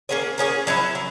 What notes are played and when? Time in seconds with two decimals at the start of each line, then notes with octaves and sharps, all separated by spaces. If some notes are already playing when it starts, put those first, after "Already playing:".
0.09 A#3 C#4 G#4 C#5
0.38 A#3 C#4 G#4 C#5
0.67 F#3 C#4 E4
0.95 F#3